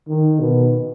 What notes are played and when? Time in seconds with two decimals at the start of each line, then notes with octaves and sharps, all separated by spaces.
0.09 D#3
0.40 B2